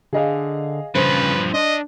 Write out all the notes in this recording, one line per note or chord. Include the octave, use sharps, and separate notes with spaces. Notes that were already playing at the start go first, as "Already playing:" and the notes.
D3 G#4 D#5 F5
G2 C#3 F3 B4 C5
D4 D#5